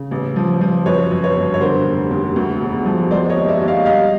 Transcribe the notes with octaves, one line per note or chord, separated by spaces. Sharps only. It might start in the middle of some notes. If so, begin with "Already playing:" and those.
Already playing: C#3
A1
F3
F3
F#2 B4 C#5
F#2
B4 C#5
G1
C#5
D3 A#4 C5
F1
D#2
D2
E1
F3
G#3 C5 D5
C#5 D#5
D#2
D5 E5
D#2
D#5 F5
G3 D#5 F5